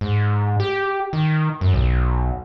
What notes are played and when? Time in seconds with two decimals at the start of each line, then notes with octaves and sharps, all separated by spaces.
0.01 G#2
0.60 G4
1.13 D#3
1.61 F#2
1.74 B1